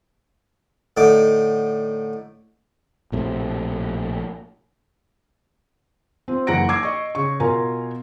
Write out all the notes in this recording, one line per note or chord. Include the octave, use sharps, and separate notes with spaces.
A2 D3 D#4 D6
A#1 A2 C3
C4 F4
F#1 E3 F#5 A#5 A#6 D7
D6 E6 G#6 C7
D#5 C#6
C#3 C#6
B2 F4 A#4 G#5 A#5